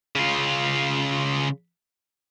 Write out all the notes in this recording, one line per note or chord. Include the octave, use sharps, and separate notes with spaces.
C#3 F4